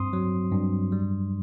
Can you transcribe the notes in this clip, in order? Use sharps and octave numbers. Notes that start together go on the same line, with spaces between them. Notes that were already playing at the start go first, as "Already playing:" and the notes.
Already playing: G2 C4 C6 D#6
F#3
G2
G3